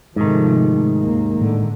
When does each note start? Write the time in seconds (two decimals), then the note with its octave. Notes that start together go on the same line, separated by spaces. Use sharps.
0.16 G#2 C3 D#3 F3 A3
0.99 D#2 A#3
1.39 A2 D3